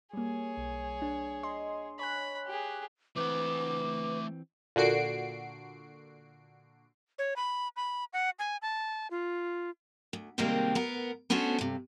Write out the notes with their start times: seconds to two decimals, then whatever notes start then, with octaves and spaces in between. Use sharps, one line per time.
0.13 G3 A#3 G#4 C#5
0.57 B1
1.02 D4
1.43 D#5 C6
1.99 C#5 G#5 B5 F#6
2.47 G4 G#4
3.16 E3 A3 C4 B4 F#5 D6
4.76 A#2 D3 F#4 C7 D7
7.19 C#5
7.36 B5
7.76 B5
8.13 F#5
8.39 G#5
8.62 A5
9.11 F4
10.13 D2
10.38 C3 D#3 G3 G#3 A#3 C4
10.75 B3 A#4
11.30 B3 C#4 D4 F#4 A4 C5
11.58 G2 C3